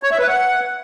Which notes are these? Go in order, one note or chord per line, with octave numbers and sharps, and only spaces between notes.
C#5
E5
B4
F#5